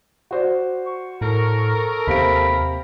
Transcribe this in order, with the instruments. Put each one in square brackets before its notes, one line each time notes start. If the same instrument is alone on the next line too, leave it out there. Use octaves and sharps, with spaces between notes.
[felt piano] F#4 C5 D5
[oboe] C#6
[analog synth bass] A2 [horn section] A4 A#4
[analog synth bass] D#2 [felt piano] C3 F5 D7 [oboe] B5